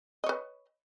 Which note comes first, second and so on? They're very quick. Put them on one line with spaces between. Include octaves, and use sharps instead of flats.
D#5 C#5 B4